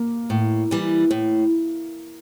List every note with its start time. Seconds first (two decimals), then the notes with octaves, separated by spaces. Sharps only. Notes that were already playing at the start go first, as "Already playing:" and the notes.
Already playing: A#3
0.30 A2
0.71 E3 G3
1.11 A2